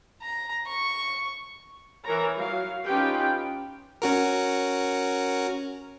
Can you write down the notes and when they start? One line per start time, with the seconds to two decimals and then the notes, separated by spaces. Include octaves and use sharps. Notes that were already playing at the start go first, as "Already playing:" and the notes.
0.22 A#5
0.66 C#6
2.04 E3 A#4 C#5 A#5
2.36 F#3 F5
2.85 C#4 D#4 F4 G4 B4 G5
4.02 C#4 F#4 A#4